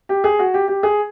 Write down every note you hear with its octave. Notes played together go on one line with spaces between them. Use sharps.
G4
G#4
F#4
G4
G4
G#4